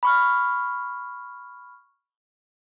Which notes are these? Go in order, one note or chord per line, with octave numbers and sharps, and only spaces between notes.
B5 C#6 F6